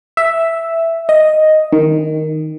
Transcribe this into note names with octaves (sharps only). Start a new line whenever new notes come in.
E5
D#5
D#3